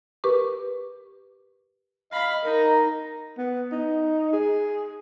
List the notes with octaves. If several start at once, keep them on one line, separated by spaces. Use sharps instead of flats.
G4 A#4 B4 C#6 D6
D#5 F5 B5
D#4 A#4 A#5
B3
D#4
G#4